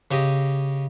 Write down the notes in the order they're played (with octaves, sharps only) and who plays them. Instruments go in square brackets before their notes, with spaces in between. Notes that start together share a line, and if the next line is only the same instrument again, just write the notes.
[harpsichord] C#3 G4 D#5